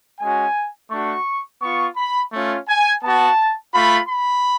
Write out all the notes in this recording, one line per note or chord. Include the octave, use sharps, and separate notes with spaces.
G#3 C#4 F#4 G#5
A3 D4 F#4 C#6
B3 F4 C#6
B5
A3 C#4 F4
G#5
B3 F#4 A5
A3 F4 B5
B5